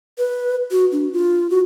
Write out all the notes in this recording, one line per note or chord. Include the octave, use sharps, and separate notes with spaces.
B4
F#4
D4
F4
F#4